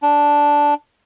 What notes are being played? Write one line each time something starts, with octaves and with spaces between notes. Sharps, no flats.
D4